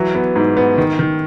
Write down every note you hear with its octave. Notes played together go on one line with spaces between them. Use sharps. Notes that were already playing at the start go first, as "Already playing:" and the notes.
Already playing: E3 F#3
B3
G#2
B3
D#3
D#3